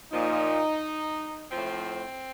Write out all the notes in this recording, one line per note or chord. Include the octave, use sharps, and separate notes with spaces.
A#2 F3 D#4
A2 F3 C4